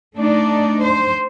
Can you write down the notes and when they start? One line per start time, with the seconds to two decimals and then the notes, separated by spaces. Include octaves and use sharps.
0.16 A3 D4 D#4 D5
0.82 C5